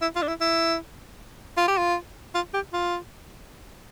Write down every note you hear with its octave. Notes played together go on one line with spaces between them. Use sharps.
E4
F4
D4
E4
E4
F4
G4
F4
F4
G4
F4